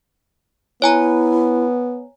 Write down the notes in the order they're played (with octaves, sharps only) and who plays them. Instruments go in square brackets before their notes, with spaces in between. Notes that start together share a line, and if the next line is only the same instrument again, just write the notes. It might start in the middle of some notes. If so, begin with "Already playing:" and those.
[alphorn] B3 [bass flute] E4 [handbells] C#5 G#5 A#5